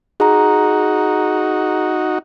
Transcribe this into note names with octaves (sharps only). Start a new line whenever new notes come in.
D#4 F#4 G#4 A#5